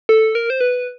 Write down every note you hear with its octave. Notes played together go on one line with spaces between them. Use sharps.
A4
A#4
C5
B4